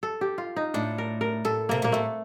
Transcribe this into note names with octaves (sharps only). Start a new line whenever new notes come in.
A4
G4
F4
D#4
A2 D4
A#4
A#4
A2 A4
C3 A#3
A#2 A#3
A2 A3